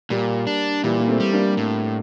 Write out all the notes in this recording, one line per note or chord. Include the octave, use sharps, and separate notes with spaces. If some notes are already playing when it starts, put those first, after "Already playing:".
A#2 G3 A#3
D4
A#2 E3 G3
A#3
A3 C4
G3
A#3 D4
A2